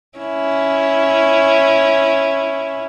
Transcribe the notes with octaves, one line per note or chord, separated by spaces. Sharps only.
C#4 E4